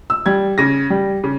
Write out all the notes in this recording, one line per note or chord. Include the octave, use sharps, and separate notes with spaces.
E6
G3 G#6
C#3 A#6
G3
C#3